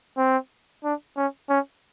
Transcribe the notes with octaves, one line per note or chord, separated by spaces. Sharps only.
C4
D4
C#4
C#4